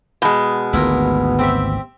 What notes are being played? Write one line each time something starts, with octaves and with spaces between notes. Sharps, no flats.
B2 G#3
G#1 D2 G#2 B3 E4 F4 A#4
C4 G4 E5